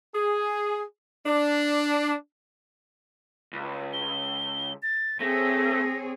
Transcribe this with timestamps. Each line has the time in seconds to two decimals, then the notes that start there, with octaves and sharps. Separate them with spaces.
0.14 G#4
1.26 D4
3.53 C#2
3.93 G7
4.83 A6
5.20 A3 C4 G#4 C#5 A#6